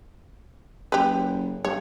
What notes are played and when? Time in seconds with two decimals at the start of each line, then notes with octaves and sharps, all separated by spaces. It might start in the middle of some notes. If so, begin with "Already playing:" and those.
0.92 F#1 G4 B4
1.65 G2 C#5